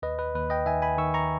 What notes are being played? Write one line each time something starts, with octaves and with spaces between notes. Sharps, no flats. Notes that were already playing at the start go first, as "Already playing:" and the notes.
D#2 B4 D#5
B4
D#2 B4
D#5 G5
D#3 E5 G#5
G#5 B5
D#3 C#6 E6
A#5 C#6